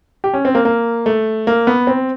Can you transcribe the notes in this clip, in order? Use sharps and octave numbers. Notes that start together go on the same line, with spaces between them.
G4
C#4
C4
A#3
A#3
A3
A#3
B3
C4